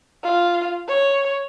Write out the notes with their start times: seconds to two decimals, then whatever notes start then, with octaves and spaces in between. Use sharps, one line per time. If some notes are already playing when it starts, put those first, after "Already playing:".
0.24 F4 F5
0.88 C#5